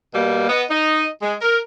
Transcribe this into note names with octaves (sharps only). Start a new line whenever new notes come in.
B2 G3 A#3
B3 D#5
D#4 D#5
G#3
A#4